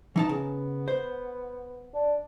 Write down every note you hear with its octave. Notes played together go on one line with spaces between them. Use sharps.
E3 B3 D#4 A5
C#3
C5
D4